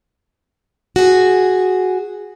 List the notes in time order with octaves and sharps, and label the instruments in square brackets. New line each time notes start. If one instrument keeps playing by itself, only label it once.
[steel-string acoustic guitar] F#4 G#4